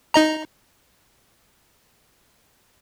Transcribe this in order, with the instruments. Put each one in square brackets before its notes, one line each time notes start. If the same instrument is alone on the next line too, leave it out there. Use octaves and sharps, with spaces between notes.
[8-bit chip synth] D#4 D#5 A#5